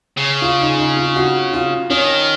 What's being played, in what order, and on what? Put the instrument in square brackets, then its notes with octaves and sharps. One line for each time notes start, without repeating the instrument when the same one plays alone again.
[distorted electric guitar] C#3
[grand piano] F4
D#4
D#4
F4
F#4
F4
[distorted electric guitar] D#3 [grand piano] C#4